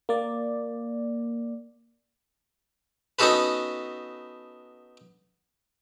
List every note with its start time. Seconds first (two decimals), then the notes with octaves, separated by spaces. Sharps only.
0.09 A#3 D5
3.19 B3 C#4 D#4 F#4 A4 B4